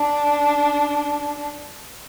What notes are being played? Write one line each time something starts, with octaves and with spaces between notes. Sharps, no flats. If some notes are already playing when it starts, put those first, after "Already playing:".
Already playing: D4